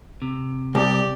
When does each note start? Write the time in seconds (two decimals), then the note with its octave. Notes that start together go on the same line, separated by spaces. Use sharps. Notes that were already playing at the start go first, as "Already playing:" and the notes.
0.22 C3
0.75 C2 G4 D5